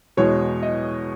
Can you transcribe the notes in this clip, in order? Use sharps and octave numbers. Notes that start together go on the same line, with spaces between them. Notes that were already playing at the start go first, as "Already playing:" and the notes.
E2 B2 G#3 C#5
D#5